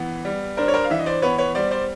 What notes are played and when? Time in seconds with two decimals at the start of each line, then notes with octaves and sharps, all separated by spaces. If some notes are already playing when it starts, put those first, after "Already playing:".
Already playing: E3 B3
0.25 G3
0.57 D4 A#4 C5
0.68 C#5
0.74 A#4 C5
0.84 F5
0.90 E3 E5
0.99 D#5
1.06 C5 D5
1.22 B3 B4 C#5
1.38 B4 C#5
1.55 G3 C5 D5
1.71 C5 D5